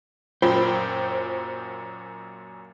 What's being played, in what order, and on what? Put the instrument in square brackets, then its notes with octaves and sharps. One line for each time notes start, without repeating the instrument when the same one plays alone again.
[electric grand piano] F#2 A#2 G5 [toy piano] F4 [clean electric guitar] C5